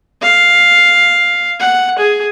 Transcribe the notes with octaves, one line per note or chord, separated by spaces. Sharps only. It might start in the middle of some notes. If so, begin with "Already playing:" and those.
F5
F#5
G#4